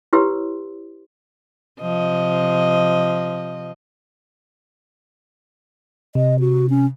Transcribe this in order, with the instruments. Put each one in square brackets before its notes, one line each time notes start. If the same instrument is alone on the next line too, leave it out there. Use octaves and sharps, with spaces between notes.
[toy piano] E4 G4 B4 C#5 C6 E6
[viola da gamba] C3 F3 D#5
[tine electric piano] C3 [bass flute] D#5
[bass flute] F#4
C#4